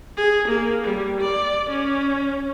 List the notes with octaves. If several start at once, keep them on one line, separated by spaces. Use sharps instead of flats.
G#4
A#3
G3
D5
C#4